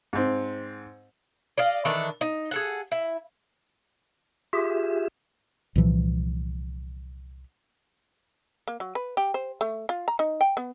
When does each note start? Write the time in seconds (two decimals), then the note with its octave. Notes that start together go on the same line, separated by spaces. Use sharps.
0.13 G#2 C4
1.57 D5 D#5 F5
1.85 D#3 E3 D4 A4
2.21 D#4
2.51 G#4 A4 F#5
2.92 E4
4.53 F4 G4 G#4 E5
5.76 C2 A#2 E3 F3
8.68 A#3
8.80 F#3
8.95 B4
9.17 G4
9.34 C5
9.61 A3
9.89 F4
10.08 A#5
10.19 D#4
10.41 G5
10.57 B3